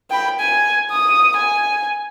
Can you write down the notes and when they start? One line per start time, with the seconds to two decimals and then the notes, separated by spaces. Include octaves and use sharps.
0.10 G5 B5
0.40 G#5
0.91 D#6
1.37 G#5